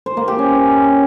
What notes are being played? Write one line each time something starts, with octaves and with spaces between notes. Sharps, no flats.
C5
A#3
G4
C#4